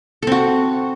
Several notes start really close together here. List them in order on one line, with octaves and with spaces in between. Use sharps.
A4 C4 F#4